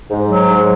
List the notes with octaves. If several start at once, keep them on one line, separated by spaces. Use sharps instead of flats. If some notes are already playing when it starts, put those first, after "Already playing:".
G#2
F#3
G#2